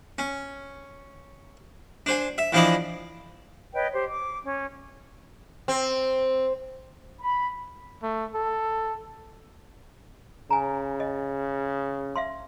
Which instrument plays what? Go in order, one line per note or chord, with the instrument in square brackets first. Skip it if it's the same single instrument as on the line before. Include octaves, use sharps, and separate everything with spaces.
[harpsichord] C#4
D4 C5 G#5
E5
E3 F3 D4 E4 D5 D#5
[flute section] B4 C#5 D#5 G5
G4 C5
D6
C#4
[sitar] C4
[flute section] B5
[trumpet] A3
A4
[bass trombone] C#3 [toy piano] G#5 A#5
[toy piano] D#5
E5 F5 C6